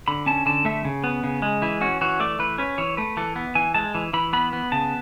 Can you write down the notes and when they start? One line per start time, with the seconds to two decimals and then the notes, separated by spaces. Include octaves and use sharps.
0.08 D3 B5
0.26 C#4 A5
0.46 D3 A5
0.65 A3 E5
0.85 C#3
1.04 B3
1.24 C#3
1.42 G#3
1.62 E3 E4
1.81 C#4 F#4
2.01 E3 F#4
2.20 A3 D5
2.39 E3 B4
2.58 C#4 B4
2.78 E3 C#5
2.97 A3 B4
3.17 E3 A4
3.36 B3
3.55 E3 G#5
3.74 G#3 A5
3.95 E3
4.13 E3 B5
4.33 B3 B5
4.53 B3
4.72 C#3 A5